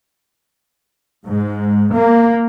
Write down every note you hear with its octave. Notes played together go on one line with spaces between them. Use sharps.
G#2
A#3